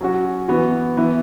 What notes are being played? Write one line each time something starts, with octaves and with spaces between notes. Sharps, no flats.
F#3 C#4 F#4
E3 B3 F#4
E3 B3 E4